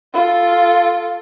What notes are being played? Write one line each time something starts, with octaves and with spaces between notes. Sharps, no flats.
F4 A4